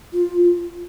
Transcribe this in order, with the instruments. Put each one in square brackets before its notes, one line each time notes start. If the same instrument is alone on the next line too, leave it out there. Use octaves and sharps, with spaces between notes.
[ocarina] F4